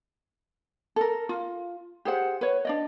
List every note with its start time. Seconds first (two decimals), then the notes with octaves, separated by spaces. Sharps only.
0.96 A4 A#4
1.29 F4
2.05 G4 G#4 C5 F#5
2.41 B4 C#5
2.65 D4 D5 D#5